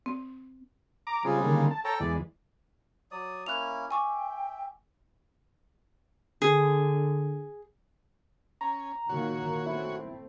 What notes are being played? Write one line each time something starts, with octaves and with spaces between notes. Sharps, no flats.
C4
A#5 D6
C#3 G3 G#3 C4 F4 G#4
D3 D#3 A#3
A5
A4 C#5 G5 A5 A#5
E2 E3 G#3 D5
F#3 D5 D#6
A#3 C#4 E4 F#6 F7
E5 G5 G#5 C#6 D6
D3 G#4
C#4 A#5
A#2 D#3 A#3 F#4 C#5
A3 C4 E4